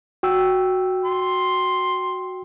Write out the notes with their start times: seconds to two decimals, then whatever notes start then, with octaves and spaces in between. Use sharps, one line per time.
0.23 F#4 G5 E6
1.05 C6